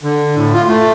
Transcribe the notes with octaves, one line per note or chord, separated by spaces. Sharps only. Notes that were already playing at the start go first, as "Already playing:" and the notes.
D3
A2
F4
A3